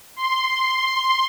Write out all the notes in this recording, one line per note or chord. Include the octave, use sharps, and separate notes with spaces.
C6